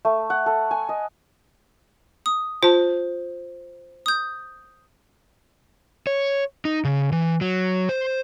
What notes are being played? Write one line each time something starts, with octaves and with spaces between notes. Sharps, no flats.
A3
F#5
A4
G#5
D#5
D#6
F4 C5 A5
D#6 G6
C#5
D#4
C#3
E3
F#3
C5